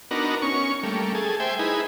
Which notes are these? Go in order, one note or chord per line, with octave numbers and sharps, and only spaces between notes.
B3 D4 D#4 F#4 A#4
C#4 C#6
G3 A3 A#3
G#4 A4
C5 E5 G5 G#5
D#4 E4 G#4 B4